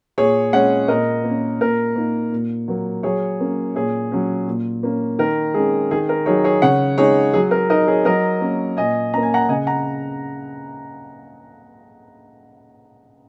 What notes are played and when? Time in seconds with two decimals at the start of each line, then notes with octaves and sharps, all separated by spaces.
0.18 A#2 G#4 C#5
0.53 G#3 C#4 C#5 F#5
0.88 A#2 A#4 D#5
1.24 A#3
1.30 C#4
1.61 A#2 A#4
1.96 A#3 D#4
2.32 A#2
2.68 F#3 A#3
3.03 F#3 G#4 C#5
3.40 A#3 C#4
3.75 A#2 G#4 C#5
4.12 F#3 C#4
4.48 A#2
4.83 A#3 C#4
5.19 D#3 A#4
5.54 G#3 C#4 G#4
5.91 D#3 G#4
6.09 A#4
6.26 F#3 D#4 G#4 C#5
6.44 G#4 C#5
6.62 C#3 C#5 F#5
6.98 G#3 D#4 G#4 C#5
7.34 F#3 G#4
7.51 A#4
7.70 D#4 A#4 D#5
7.87 G#4 C#5
8.05 F#3 A#4 D#5
8.41 A#3 C#4
8.77 A#2 D#5 G#5
9.13 A#3 C#4 A#5
9.23 G#5
9.34 F#5 A#5
9.49 C#3 D#5 G#5
9.67 F#5 A#5